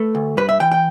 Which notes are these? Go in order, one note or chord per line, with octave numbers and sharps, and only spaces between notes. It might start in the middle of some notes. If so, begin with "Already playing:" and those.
Already playing: A3 B4
D2
G2 B4
E5
E3 G5
G5